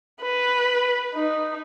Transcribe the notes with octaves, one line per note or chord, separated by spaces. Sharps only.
B4
D#4